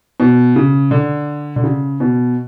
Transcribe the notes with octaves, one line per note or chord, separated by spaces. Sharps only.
B2
C#3
D3
D3
C#3
B2